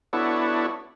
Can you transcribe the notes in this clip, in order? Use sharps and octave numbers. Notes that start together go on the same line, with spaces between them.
B3 D4 E4 F#4 A4 C#5